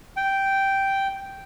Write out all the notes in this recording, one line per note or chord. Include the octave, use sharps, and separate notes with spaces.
G5